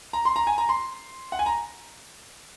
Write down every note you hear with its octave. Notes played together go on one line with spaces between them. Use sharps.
A#5
C6
A#5
G#5
A#5
C6
F#5
G#5
A#5